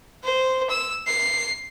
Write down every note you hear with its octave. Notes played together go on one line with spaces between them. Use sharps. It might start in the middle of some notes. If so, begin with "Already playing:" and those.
C5
E6
C7